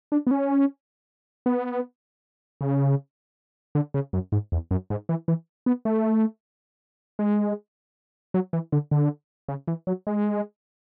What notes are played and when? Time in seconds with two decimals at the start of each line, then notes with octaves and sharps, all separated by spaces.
0.12 D4
0.27 B3
0.31 C#4
1.46 B3
2.61 C#3
3.75 D3
3.94 C#3
4.13 F#2
4.32 G#2
4.52 E2
4.71 F#2
4.90 G#2
5.09 E3
5.28 E3
5.66 B3
5.85 A3
7.19 G#3
8.34 F#3
8.53 E3
8.72 D3
8.91 D3
9.48 C#3
9.68 E3
9.87 F#3
10.07 G#3